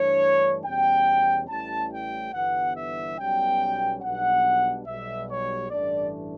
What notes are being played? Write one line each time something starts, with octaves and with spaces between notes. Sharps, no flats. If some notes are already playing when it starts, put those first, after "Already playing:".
Already playing: G2 E3 A3 D4 C#5
E2 B2 G3 C#4 G5
A1 A2 E3 G3 C#4 A5
G5
G1 G2 E3 B3 F#5
E5
B1 B2 G3 C#4 G5
B1 B2 G3 D4 F#5
B1 B2 G3 E5
C#5
A1 G2 E3 A3 D4 D5